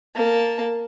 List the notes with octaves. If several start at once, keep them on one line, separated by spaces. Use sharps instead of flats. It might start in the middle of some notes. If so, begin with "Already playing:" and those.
A#3 A5